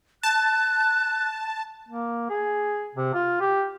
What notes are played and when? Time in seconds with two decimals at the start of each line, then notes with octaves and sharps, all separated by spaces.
0.23 A5 F#6
1.89 A#3
2.30 G#4
2.95 C3
3.14 F4
3.41 G4